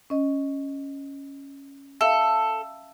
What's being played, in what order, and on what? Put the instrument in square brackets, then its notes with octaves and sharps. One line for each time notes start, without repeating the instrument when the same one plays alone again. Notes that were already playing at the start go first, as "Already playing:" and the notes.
[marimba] C#4 D#5
[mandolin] A4 [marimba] E5 F5